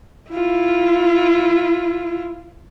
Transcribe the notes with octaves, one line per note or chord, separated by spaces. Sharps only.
E4 F4